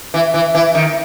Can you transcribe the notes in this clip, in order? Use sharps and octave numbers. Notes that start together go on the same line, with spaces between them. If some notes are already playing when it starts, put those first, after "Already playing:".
E3
E3
E3
D#3